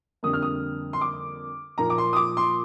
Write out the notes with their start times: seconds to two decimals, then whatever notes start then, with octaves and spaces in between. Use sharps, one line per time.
0.23 F2 D3 G3 A#3 D#6
0.33 F6
0.42 D#6
0.93 C6
1.01 D6
1.78 A#2 F3 A#3 A#5
1.90 D6
1.98 C6
2.13 D#6
2.16 D6
2.37 C6